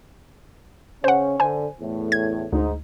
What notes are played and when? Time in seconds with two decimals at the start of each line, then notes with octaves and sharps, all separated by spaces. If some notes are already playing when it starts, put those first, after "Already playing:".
1.04 C#3 C#4 C5 F#5
1.40 D3 C5 G#5
1.80 E2 A2
2.12 G#6
2.52 D2 G#2 D#4